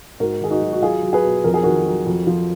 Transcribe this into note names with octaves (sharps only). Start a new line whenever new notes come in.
G#2 F#4 A#4
D#3 G#4
D#4 F#4
F#3
F#4
F#3 F4 G#4
F#3
G#4 B4
B2
F2 A#4
G#4
D#3 F#4 A#4
F#3
F2
F3